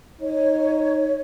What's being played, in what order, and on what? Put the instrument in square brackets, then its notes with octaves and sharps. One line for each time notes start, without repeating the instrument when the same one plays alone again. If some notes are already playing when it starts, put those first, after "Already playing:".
[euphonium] D#4 [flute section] C#5